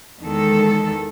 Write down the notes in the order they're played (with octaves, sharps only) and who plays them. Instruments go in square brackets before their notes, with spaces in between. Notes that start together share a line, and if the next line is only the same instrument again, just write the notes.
[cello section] E2 D#3 G#3 A4